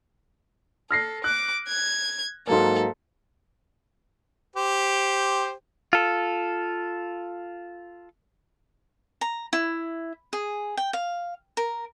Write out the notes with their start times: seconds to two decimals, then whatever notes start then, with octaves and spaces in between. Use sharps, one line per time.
0.91 A4 F6 A#6 C7
1.24 D6 F#6
1.69 G#6
2.47 G#2 F#3 A#3 A4
4.56 G4 C5
5.93 F4 A4
9.21 A#5
9.53 E4
10.33 G#4
10.77 G5
10.93 F5
11.57 A#4